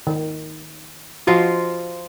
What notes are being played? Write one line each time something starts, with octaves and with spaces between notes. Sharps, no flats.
D#3
F3 F4 F#4 D#5